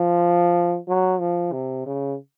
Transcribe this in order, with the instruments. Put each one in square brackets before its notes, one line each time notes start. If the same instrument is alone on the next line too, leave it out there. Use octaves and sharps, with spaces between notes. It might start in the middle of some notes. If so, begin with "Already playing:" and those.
Already playing: [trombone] F3
F#3
F3
C3
C#3